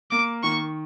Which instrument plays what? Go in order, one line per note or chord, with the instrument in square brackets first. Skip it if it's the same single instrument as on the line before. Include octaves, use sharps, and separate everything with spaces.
[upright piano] A#3 [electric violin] D6
[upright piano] D#3 [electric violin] C#6